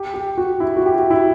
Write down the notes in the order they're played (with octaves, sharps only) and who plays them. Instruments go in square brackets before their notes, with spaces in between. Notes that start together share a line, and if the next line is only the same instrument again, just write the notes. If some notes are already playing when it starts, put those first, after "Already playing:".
Already playing: [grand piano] G4
G4
F#4
E4
F#4
G4
F#4
E4